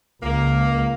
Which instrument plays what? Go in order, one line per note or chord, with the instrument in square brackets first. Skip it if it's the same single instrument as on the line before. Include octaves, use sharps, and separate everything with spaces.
[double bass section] C#2 [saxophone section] A#3